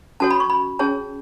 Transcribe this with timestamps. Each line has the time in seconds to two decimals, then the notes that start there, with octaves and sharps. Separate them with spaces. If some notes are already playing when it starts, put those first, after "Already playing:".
0.20 C#4 F#4 A4 C#5 A5
0.31 B5
0.40 C#6
0.50 B5
0.79 C#4 G#4 C#5 A5